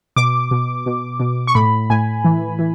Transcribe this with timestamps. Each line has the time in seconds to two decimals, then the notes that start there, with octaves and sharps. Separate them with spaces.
0.16 B2 D6
0.51 B2
0.86 B2
1.20 B2
1.47 C#6
1.55 A2 B5
1.90 A2 G#5
2.25 E3
2.59 E3